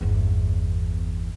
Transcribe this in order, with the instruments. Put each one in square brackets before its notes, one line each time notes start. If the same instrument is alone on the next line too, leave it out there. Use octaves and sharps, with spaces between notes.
[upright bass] G1 E2